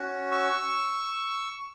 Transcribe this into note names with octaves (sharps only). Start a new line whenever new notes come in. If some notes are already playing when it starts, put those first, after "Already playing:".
Already playing: C#4 F#4
C#6 E6